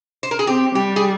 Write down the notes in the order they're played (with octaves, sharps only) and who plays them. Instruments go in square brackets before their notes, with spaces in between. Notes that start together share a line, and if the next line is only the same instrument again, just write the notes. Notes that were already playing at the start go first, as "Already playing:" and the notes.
[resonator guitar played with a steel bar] C5
A#4
G#4
[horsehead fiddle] C4 [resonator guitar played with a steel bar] G4
[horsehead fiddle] G3 [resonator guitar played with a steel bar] G4
[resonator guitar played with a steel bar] G#4